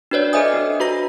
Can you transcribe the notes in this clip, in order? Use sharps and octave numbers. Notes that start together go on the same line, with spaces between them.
D4 F#4 B4 C#5 D5
A4 C5 D#5 E5 G#5 D#6
D4
F#4 B4 A#5 A#6